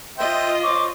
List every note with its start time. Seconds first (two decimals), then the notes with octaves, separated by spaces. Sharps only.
0.18 F4 C5 D#5 E5 G5
0.63 C5 C#5 D6